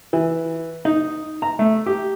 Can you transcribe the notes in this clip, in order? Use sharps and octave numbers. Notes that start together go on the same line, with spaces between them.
E3
D#4
A#5
A3
G4